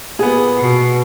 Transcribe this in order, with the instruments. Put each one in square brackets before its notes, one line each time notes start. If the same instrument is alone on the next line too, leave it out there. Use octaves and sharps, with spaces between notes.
[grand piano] A#2 B3 [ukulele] G#4
[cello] B2